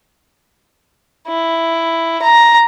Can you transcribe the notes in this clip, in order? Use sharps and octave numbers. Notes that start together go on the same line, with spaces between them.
E4
A#5